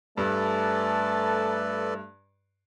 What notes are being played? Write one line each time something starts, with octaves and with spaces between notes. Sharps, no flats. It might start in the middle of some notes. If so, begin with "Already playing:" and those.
G2 A3 A4 B4 D5 A5